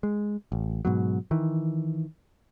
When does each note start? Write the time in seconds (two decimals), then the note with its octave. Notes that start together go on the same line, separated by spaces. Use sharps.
0.03 G#3
0.52 A1
0.85 G#2 B2 F#3
1.31 D#3 E3